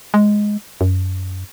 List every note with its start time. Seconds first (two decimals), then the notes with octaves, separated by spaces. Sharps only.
0.14 G#3
0.81 F#2